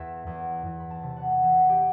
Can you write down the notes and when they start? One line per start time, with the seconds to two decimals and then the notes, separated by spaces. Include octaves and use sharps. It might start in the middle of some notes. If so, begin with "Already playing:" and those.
Already playing: E2 E5
0.27 E2
0.66 E2
0.80 B5
0.90 A5
1.03 C3
1.17 F#5
1.31 F#5
1.43 E3 E5
1.69 G4